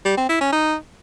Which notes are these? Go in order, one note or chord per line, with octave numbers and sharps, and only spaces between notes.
G3
C4
E4
C#4
D#4